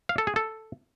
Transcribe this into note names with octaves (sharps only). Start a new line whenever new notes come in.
F5
A4
G#4
A4